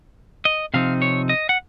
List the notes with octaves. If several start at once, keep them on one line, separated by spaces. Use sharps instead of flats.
D#5
C3 F3 C4 D#4 F5
C#5
D#5
F#5